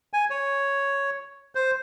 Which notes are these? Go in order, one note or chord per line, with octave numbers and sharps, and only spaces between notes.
G#5
C#5
C5